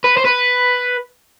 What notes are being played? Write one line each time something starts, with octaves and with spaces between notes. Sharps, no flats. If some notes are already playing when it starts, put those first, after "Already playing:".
B4
C5
B4